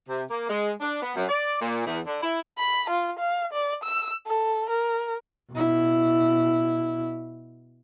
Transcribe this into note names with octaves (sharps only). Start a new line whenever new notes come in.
C3
A#3
G#3
D4
B3
F#2
D5
A#2
E2
D3
E4
B5
F4
F5
D5
E6
A4
A#4
B2 E4